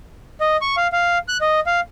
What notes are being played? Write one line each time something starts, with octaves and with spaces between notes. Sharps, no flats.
D#5
C#6
F5
F5
F#6
D#5
F5